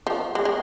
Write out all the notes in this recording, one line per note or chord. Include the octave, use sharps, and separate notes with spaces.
F3
G#3
G#3